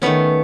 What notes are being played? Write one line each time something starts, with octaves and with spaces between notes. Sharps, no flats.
D#3 A3 B3 C#4